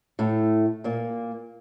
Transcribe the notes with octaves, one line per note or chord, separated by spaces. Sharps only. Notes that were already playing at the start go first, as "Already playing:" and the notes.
A2 A3
A#2 A#3